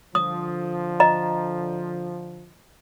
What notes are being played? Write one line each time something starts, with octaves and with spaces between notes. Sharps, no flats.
D3 F3 D#6
D#5 A#5